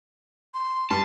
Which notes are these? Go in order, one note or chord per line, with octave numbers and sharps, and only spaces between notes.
C6
G2 A5